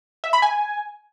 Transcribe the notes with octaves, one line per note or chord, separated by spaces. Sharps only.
E5
B5
G#5